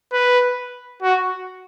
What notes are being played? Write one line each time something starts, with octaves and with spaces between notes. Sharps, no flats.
B4
F#4